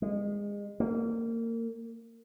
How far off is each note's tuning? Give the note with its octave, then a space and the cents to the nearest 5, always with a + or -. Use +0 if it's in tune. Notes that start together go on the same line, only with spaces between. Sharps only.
G#3 -30
A#3 -25